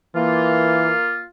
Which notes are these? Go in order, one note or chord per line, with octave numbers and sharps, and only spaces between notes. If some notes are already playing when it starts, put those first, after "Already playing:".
E3 A#3 F4